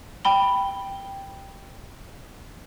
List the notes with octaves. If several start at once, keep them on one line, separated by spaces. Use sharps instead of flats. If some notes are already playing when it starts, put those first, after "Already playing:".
G5 B5 G7